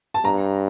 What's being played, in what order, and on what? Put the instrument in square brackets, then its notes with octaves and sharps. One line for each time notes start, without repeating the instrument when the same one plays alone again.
[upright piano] A5
[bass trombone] G2 [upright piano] A#5